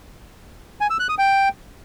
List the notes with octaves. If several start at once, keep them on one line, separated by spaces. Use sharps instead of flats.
G#5
E6
F#6
D#6
G5